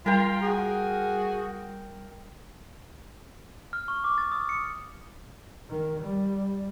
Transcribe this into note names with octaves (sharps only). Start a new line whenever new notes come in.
G3 F4 A#4 G5
F#4 G#4
F6
C#6
D6
A6
D#6
C#7
D#3
G3